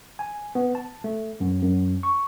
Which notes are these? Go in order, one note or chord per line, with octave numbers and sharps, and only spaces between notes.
G#5
B3
A5
A3
F#2
F#2
C#6